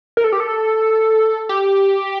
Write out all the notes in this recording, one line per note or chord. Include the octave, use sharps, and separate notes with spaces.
A#4
A4
G4
A4
G4